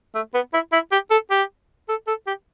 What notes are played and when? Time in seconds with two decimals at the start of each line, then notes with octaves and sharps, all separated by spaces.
0.15 A3
0.34 B3
0.53 E4
0.72 E4
0.92 G4
1.11 A4
1.31 G4
1.89 A4
2.07 A4
2.27 G4